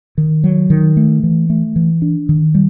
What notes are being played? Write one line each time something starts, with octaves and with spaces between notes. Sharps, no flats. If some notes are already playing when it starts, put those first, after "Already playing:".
D#3
F#3
D#3
A3
E3
A3
E3
D4
D#3
G3